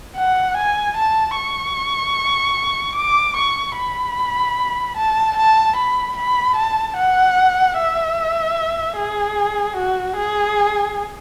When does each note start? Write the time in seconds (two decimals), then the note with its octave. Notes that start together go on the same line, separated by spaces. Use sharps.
0.17 F#5
0.57 G#5
0.97 A5
1.37 C#6
2.96 D6
3.37 C#6
3.77 B5
4.97 A5
5.37 A5
5.77 B5
6.17 B5
6.57 A5
6.97 F#5
7.77 E5
8.97 G#4
9.77 F#4
10.17 G#4